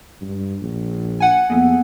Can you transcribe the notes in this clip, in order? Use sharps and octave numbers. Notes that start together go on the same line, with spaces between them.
G2
A#1
F#5 G#5
F2 A#3 B3